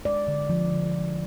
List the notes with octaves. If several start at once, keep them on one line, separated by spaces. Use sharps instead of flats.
G#3 D5
D3
F3
D3
F3